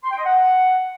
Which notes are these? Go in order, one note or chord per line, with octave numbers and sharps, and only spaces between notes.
C6
G5
D#5
F#5